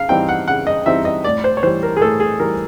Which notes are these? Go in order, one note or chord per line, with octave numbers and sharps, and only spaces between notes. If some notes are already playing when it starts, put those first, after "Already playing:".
Already playing: C#3 F5
E3 G3 C4 D#4 G5
F#5
C#3 F#5
D#5
E3 G3 C4 D#4 E5
D#5
A2 D5
C5
C#5
E3 G3 C5
A#4
G#4
A2 A4
G#4
E3 G3 A#4